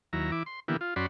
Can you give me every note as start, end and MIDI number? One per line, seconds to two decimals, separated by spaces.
0.13 0.31 39
0.13 0.31 54
0.13 0.31 64
0.13 0.31 82
0.32 0.43 52
0.32 0.43 64
0.32 0.43 86
0.46 0.60 84
0.68 0.77 50
0.68 0.77 52
0.68 0.77 58
0.68 0.77 59
0.68 0.77 64
0.68 0.77 67
0.81 0.94 65
0.96 1.06 42
0.96 1.06 61
0.96 1.06 66
0.96 1.06 74
0.96 1.06 83
0.96 1.06 84